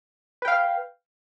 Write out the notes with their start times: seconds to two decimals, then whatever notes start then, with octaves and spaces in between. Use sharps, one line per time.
0.42 B4
0.45 G5
0.48 F5